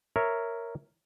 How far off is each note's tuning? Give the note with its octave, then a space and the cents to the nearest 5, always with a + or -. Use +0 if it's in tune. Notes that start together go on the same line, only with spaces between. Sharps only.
A#4 -5 C#5 +0 E5 +0